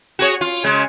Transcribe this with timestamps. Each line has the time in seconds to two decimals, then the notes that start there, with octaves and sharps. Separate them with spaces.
0.19 F#4 G#4 C#5
0.41 F4
0.64 C#3 G#3